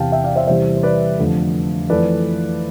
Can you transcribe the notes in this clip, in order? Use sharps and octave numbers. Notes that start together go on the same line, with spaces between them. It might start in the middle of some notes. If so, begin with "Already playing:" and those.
Already playing: E2 C3 E3 F5 G5 A5
E5 G5
D5 F5
C5 E5
E2 C3 E3 G3 C5 E5
C5
B4 D5
F2 D3 A3
F2 E3 A3 B4 D5